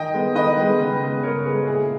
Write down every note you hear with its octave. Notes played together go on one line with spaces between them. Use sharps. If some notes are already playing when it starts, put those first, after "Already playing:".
Already playing: D#3 D#5 G5
G#3 B3
D#3 B4 D#5
G#3 B3
C#3
G#3 B3
C#3 A#4 C#5
G#3 B3 G#4 B4
A#2 E4 G#4